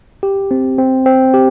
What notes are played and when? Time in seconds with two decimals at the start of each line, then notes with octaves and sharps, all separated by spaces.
0.23 G4
0.51 C4
0.78 C4
1.06 C4
1.34 G4